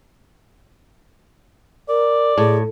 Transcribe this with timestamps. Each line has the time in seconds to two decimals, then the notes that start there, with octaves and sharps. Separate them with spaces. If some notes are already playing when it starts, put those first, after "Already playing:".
1.89 A#4 D5
2.38 A2 G#4